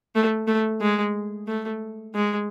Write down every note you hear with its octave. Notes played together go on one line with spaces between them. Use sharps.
A3
A3
G#3
A3
G#3